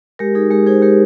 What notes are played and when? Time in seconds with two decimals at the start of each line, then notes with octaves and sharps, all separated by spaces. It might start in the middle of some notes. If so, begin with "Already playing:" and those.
0.19 G#3 G4 A#4
0.35 D#4 G#4
0.50 G#3 G4 A#4
0.67 D#4 G#4 C5
0.82 G#3 G4 A#4